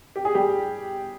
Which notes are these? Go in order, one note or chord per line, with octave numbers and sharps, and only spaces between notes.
G4
G#4
G3 G4